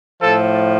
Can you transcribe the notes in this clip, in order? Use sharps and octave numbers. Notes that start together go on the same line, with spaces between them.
A2 F3 A4